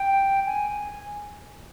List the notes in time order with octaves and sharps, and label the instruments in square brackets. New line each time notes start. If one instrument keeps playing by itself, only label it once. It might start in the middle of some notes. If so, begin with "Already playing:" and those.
Already playing: [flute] G5
G#5